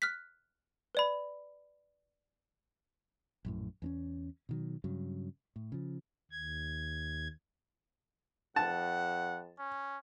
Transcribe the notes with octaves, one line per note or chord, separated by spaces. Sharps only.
F6 F#6 B6
B4 D5 B5
A#1 F#2 A2
E2 C4 C#4
B2 D#3 F#3
G2 C#3 F#3
A2
C#3 F3
D#2 G#6
F2 F#5 A5
C#4